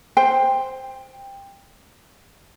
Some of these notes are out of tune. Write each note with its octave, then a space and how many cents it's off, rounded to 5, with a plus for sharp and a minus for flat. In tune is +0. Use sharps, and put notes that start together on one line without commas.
C5 +0 G5 +15